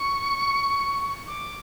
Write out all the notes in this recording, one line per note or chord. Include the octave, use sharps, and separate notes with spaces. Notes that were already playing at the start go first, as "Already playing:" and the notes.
Already playing: C#6
D6